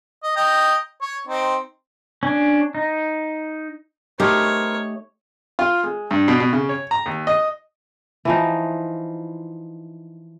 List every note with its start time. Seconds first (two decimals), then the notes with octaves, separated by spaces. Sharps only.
0.23 D#5
0.36 D#5 G5 A#5
1.01 C#5
1.27 C4 D#4
2.23 C#4 D4
2.75 D#4
4.20 A3 D#4 G4 A#4 C5 C#5
5.59 F4
5.83 G#3
6.11 G2
6.28 B2
6.40 B2
6.53 C#3
6.69 C#5
6.91 A#5
7.06 D#2
7.27 D#5
8.25 E3 F3 D#4